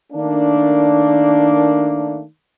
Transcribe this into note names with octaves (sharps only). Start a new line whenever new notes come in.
D#3 A3 A#3 D4